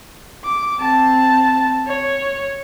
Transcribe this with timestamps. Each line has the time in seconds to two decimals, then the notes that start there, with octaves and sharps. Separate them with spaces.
0.44 D6
0.80 C4 A5
1.87 C#5